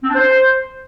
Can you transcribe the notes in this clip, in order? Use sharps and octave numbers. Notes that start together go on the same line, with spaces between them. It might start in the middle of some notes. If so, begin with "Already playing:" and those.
C4
D4
C5